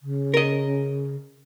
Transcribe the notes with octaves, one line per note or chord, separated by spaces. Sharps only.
C#3
A#4 D#5